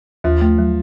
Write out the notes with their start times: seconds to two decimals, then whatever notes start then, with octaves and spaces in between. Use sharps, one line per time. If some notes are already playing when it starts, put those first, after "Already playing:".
0.24 D#2 F3
0.41 A3
0.58 F#3